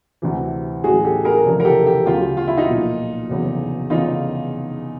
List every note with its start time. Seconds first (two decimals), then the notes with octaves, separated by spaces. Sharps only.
0.22 D2 C3 E3
0.84 A1 A2 F#3 F#4 G#4
1.04 G4 A4
1.24 G#4 A#4
1.45 F1 F2 C#3 E3
1.60 A#4
1.65 G4 A4
1.86 G4 A4
2.06 D2 C#3 F#3 F4 G4
2.37 F4
2.48 E4
2.57 D#4 F4
2.67 B1 A#2 F3
3.29 F1 E2 C#3 F#3
3.90 F1 E2 C#3 D#4 F4